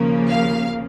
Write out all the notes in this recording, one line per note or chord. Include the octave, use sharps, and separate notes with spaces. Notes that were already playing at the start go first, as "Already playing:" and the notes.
Already playing: D#2 C#3 F3 A#3
F5